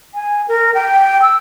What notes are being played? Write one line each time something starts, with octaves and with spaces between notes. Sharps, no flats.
G#5
A#4
G5
E6